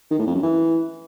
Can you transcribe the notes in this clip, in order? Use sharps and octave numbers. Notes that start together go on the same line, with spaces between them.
D#3
A2
F2
F#2
E3